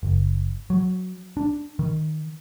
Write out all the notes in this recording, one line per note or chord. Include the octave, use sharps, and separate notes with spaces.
F#1
F#3
D4
D#3